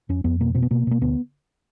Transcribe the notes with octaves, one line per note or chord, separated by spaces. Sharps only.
F2 C#4
F2 B3
B2 A#3
B2 C4
B3
B2 A#3
B2 A#3
D2 B3